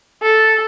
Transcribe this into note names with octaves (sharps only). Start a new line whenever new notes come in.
A4